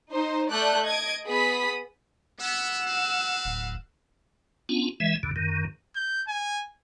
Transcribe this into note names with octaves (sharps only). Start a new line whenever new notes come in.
D#4 C5
A3 D5 F#6 G6
D#5 G#6 D7
B3 G#4 B5 D#6 B6
B3 F#5 E6
C4 B4 F5
D1
B3 C#4 D4 F4
E3 G#3 E5
E2 G2 D3
F#2 D#3
G6
G#5